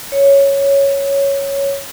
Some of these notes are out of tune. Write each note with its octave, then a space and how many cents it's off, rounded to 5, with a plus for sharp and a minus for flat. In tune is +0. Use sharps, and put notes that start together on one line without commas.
C#5 +0